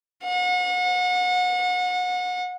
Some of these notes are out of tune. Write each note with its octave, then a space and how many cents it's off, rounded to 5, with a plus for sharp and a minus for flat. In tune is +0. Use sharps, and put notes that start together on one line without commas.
F#5 -35